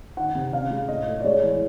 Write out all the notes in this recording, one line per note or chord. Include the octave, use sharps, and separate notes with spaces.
D#3 F#5
C3
C#4 F5
G#3
A2 D#5
A3
D5
G#3 C#5
E3